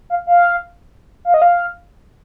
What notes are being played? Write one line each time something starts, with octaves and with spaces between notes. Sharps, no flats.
F5
F5
F5
D#5
F5